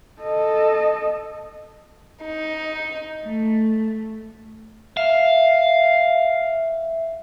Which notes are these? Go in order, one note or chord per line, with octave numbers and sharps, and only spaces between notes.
A4 D#5
D#4
A3
E5 F5